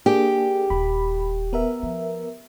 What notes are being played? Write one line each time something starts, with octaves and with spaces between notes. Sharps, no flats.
A#3 D4 G4 G#4
D#1 B5
B3 A#4 E5
F3